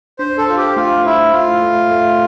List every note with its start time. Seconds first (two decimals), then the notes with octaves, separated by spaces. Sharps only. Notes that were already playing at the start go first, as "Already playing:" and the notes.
0.19 D4 C5
0.38 A4
0.48 F4 C5
0.57 G4
0.76 A3 F4
1.04 E4 C5
1.33 A3 F4
1.62 A3
1.91 A3